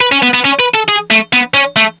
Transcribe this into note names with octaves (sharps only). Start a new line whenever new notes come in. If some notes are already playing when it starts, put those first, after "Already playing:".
B4
C#4
B3
B3
C#4
B4
A4
G#4
A3
B3
C#4
A3